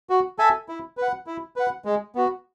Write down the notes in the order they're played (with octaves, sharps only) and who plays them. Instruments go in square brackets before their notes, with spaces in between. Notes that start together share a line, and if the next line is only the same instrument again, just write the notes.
[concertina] F#4
A4 E5 G#5
E4
B4 F#5
E4
B4 F#5
G#3
B3 F#4